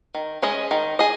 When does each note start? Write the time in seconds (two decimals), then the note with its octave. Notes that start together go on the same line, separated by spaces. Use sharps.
0.14 D#3
0.42 G#3 C#4 G#4 D#5
0.71 D#3
0.99 G#4 D#5